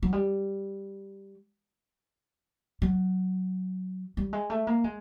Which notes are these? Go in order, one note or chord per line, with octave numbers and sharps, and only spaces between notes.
F#3
G3
F#3
G3
G#3
A3
A#3
G#3